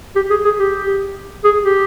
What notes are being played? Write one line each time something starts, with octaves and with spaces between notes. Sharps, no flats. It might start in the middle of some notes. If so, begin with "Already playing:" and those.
G4
G#4
G#4
G4
G#4
G4